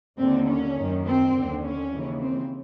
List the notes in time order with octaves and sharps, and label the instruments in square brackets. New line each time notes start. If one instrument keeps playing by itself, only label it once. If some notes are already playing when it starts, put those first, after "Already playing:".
[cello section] D#2 D3 C4
C#4
F#2 D#3
C4
D#2 D3
C#4
D#2 C#3 E3
C4